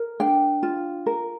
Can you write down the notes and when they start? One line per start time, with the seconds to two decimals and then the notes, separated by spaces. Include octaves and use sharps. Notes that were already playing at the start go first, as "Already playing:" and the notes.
Already playing: A#4
0.20 D4 G5
0.63 F4
1.06 A#4